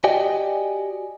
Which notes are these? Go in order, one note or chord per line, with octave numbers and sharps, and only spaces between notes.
F#4 G4 D5 D#5 G5 G#5